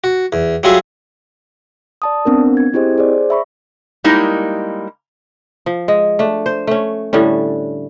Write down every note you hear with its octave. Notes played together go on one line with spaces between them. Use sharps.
F#4
E2
F#3 G3 F4 F#4 G#4 E5
D5 A5 D#6
B3 C4 D4 A#4
G#6
C4 E4 G4 G#4 C5 D#5
G#4 C5 D5
E5 B5 C#6
G3 G#3 A#3 D#4 E4
F3
G#3
A3 D4
C5
A3 C#4
A2 D3 G3 C#4